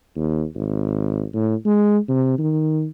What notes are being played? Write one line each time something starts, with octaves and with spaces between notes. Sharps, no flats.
D#2
G#1
A2
G#3
C3
D#3